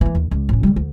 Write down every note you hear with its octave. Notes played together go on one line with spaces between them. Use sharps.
E3 A#3
D#2
C#2
A1 C#4
D3 G3
D2